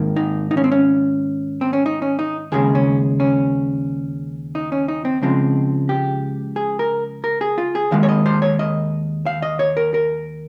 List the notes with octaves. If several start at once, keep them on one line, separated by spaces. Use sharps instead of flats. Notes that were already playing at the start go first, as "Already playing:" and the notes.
Already playing: G#2 D#3 A#3
D#4
D#4
C#4
C4
C#4
C4
C#4
D#4
C#4
D#4
D#2 C#3 G#3 G#4
C#4
C#4
D#4
C#4
D#4
C4
C#2 C#3 F3 G#3 C4
G4
G#4
A#4
A#4
G#4
F4
G#4
D#2 D#3 G#3 F5
C#5
D#5
C5
C#5
D#5
F5
D#5
C#5
A#4
A#4